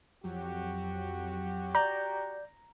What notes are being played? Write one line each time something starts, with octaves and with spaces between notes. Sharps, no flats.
F2 F#3 F#4 G4
D5 A#5 G6